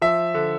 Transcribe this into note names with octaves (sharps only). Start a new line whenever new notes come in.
F3 E5
D3